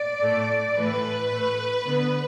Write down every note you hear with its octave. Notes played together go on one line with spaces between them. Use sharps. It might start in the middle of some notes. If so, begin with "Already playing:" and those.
Already playing: D5
A2 A3
A2 E3 A3 B4
A2 A3
D3 B3